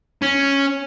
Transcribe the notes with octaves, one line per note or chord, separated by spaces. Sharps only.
C#4